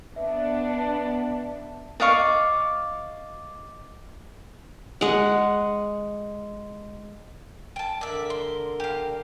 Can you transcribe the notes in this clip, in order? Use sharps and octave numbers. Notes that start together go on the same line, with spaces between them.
B3 D4 E5
D5 D#5 F5 C#6
G#3 F#5
G5 A5
D3 A#4 D5 E5
C6
G4 F5